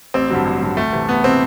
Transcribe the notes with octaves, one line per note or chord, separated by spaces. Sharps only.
A1 C4
G2 D3 F#3
A1
G2 D3 F#3
D2 A3
C3 E3
D2 B3
C3 E3 C4